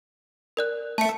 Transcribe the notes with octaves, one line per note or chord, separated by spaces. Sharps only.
A#4 D5 F#6
A3 E5 A5 C#7